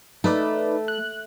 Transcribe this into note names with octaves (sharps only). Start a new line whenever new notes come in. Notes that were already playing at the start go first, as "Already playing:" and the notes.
A3 D#4 B4 D5
F#6